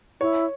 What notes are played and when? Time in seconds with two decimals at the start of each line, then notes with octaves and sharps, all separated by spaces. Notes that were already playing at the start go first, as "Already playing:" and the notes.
0.21 E4 C#5